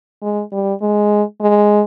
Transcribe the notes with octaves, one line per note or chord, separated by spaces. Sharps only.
G#3
G3
G#3
G#3